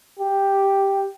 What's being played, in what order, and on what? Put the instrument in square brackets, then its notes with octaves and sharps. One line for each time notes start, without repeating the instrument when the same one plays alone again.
[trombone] G4